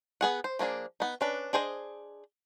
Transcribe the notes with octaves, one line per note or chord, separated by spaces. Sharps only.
B3 G#4 F#5
C5
F3 A#3 D4 G#4
B3 D#4
C#4 D4 B4
D4 G#4 C5 C#5 D#5